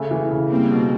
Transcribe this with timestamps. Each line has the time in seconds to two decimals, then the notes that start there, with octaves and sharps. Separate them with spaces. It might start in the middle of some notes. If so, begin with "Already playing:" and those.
Already playing: C#3 A3
0.11 E3
0.31 C#3
0.51 G3 A#3 C4
0.71 B2